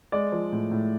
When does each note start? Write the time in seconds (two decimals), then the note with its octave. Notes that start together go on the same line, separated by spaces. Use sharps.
0.12 G#3 D5
0.32 F3
0.52 A2
0.71 A2